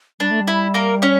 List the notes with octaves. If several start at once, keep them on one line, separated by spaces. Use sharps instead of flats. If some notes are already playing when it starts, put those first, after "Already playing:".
G3 D4
A3
G3
E4
A#3 A#4
C#4 C#5